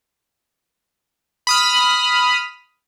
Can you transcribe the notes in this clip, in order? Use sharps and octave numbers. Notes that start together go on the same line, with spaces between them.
B5 D#6 F6